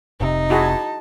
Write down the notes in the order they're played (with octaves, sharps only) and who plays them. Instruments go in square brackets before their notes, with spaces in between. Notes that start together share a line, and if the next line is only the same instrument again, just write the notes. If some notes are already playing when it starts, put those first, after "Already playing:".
[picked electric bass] F1 C3 [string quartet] D#4
[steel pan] E4 F#4 G#4 [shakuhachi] A5